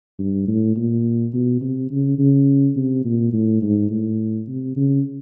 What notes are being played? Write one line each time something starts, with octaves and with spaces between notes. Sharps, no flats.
G2
A2
A#2
B2
C3
C#3
C#3
C3
A#2
A2
G#2
A2
C3
C#3